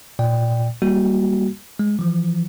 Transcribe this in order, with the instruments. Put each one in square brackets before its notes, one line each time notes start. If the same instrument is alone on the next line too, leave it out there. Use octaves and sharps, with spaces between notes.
[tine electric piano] A#2 D5 G5
G3 A#3 F#4
G#3
E3 F3